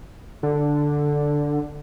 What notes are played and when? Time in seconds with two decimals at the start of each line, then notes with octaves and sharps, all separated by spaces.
0.43 D3